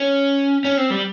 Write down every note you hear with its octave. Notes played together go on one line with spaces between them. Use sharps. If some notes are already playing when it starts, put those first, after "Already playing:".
Already playing: C#4
C#4
C4
G3